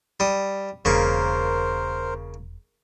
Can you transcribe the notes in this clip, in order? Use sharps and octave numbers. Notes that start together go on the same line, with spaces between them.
G3 D#6
E1 C#3 A#3 A#4 C5 C#6